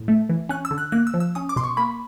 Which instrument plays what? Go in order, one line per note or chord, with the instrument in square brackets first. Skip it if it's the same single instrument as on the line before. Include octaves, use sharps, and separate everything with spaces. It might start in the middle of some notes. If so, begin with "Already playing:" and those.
Already playing: [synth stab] A2
A3
E3
C#4 F#6
E6
D3
F#6
A#3 F#6
E6
F3
E6
C#4 D#6
D6
B2 C6
C#6
A#3 B5